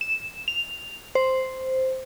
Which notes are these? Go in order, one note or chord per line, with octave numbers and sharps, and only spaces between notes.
E7
F7
C5